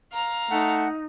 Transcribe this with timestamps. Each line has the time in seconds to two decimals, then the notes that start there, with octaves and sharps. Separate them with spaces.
0.12 F5 A#5
0.51 A3 D#4 F#5